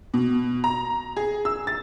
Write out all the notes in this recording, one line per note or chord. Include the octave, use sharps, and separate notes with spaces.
B2
A#5
G#4
E6
A6